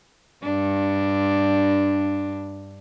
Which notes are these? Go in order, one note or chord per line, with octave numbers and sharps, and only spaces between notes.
G2 D4